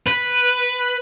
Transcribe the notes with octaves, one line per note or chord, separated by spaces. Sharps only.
B4